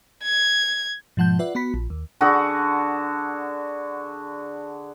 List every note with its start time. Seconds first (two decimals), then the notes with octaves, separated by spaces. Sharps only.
0.24 G#6
1.17 G#2 B2 F3 F#5 A5 G6
1.39 F4 B4 D5 E5 F#5
1.55 B3 F#4 B5 B6
1.74 A#1
1.90 D#2
2.21 D3 F#4 G#4 A4